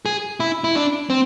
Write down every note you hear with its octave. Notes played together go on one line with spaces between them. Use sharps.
G#4
E4
E4
D4
C4